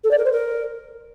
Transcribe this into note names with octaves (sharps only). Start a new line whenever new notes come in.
A4
D5
A#4
C5
A#4